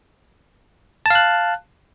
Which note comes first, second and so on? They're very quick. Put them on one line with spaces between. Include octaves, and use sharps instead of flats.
A5 F5 F#6